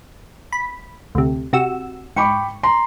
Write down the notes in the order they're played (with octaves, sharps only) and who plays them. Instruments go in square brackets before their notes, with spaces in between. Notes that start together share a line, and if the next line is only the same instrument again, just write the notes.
[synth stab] B5
D2 C3
C3 F#4 E6
[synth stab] G#2 C#6 [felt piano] G5 B5 D6
[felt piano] A#5 C6